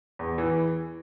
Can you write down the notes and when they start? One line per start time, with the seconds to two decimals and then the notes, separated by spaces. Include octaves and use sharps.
0.19 E2
0.38 E3